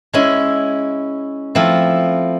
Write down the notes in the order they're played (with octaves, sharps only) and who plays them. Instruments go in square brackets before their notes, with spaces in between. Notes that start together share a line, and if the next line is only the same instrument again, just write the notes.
[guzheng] G#3 C#4 E4
F3 A3 C4 E4